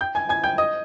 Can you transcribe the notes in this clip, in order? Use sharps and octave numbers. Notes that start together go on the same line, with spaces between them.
G5 G6
G#5 G#6
G#5 G#6
G5 G6
D#5 D#6